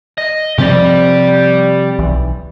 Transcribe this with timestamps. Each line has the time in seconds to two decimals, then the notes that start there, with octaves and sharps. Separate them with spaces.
0.18 D#5
0.58 C3 F3 C4 G4 D5
1.99 B1 E3